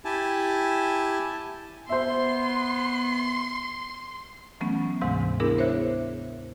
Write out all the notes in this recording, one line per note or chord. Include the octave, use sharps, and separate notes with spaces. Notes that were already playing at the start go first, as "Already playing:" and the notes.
E4 G4 G#5 A5
B3 C5 E5 C6
E3 F#3 A3 B3 C#4
D2 G#2 C3 E3 G#3 C6
B3 D4 E4 G#4 A#4
C5 C#5 E5 F#6